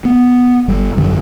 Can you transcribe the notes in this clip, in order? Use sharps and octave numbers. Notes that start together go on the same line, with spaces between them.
B3
G1 G3
G#1 F#2 D3 F#3